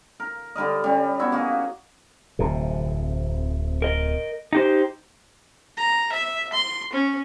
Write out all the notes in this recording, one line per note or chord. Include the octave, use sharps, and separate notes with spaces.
A#4
D3 G3 A#4 D#5
G3 C#4
B3 E4 F#4 E5
A#3 F#4 G#4 D#5
D1 F2 C3
A#4 D#5
D#4 G4 C5
A#5
E5
C6
C#4